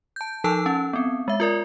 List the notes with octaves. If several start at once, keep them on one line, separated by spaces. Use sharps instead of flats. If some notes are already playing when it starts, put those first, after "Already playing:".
A5 G6
F3 D#4 A4 A5 E6
C#4
B3 C4
G#3 E5
F4 A#4 D5